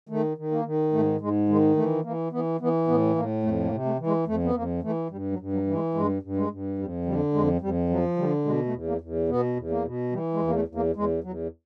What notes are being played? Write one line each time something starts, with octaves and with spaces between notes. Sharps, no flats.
D#3 A3
D#3
A#3
D#3
G#2 A3
G#2 G#3
D#3 G#3
E3 A3
E3 A#3
E3 B3
E3 B3
A2 B3
A2 A#3
F2 A3
A#3
C3
A3
E3
G#3
F2 A3
B3
F2 A#3
E3 A3
G2 G3
F#3
G2
F#3
E3
G#3
G2 G#3
G2
G#3
G2
F2 G3
D3 G3
F2 G#3
F2 G3
F3 F#3
D3 G3
B2 G#3
A3
E2
A#3
E2
B2 B3
E2
A#3
B2
E3 G3
G#3
E2
A#3
A3
E2
A#3
E2 G#3
E2 F#3